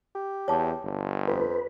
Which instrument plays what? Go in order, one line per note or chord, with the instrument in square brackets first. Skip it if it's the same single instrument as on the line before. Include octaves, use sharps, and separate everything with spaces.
[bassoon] G4
[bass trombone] E2 [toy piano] C#5 A5 D6
[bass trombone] G1
[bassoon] F2 [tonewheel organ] B4